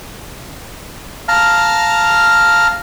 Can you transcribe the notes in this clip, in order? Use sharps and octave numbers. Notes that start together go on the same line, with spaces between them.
F5 A5 A#5 F6